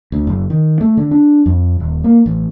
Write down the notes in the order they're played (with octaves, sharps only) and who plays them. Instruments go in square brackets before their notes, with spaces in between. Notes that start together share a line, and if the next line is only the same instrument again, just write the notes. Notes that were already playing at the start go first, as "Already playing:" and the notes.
[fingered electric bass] D2
F#1
D#3
A3
D3
D4
F2
D#1
A#3
A1